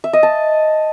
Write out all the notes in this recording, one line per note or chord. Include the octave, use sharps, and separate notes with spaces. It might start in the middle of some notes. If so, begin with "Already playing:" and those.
E5
D#5
A5